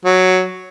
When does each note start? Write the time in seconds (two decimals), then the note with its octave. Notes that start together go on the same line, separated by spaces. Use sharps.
0.05 F#3